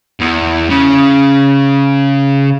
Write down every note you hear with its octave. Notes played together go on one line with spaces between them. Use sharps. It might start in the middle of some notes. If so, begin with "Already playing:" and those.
E2
C#3